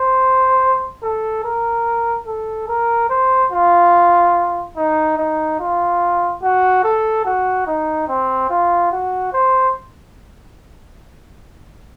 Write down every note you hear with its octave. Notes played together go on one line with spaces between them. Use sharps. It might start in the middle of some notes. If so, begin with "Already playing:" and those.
Already playing: C5
A4
A#4
A4
A#4
C5
F4
D#4
D#4
F4
F#4
A4
F#4
D#4
C4
F4
F#4
C5